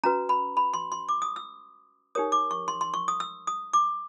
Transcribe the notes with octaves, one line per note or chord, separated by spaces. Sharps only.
C#4 F#4 B4 A#5
B5
B5
C6
C6
D6
D#6
E6
D#4 G4 A#4 C#5 D#6
D6
C#6
C6
C6
C#6
D#6
E6
D#6
D6